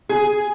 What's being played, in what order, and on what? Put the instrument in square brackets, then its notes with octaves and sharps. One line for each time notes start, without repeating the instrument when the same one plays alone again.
[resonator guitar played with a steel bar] G#4